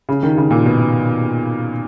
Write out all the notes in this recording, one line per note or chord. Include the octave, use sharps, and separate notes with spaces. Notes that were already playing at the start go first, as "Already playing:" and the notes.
C#3
D#3
C#3
A#2
B2